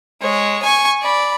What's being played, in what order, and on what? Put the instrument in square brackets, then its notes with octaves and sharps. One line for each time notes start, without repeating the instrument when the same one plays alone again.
[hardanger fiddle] G#3 C#5
G#5 C#6
D5 B5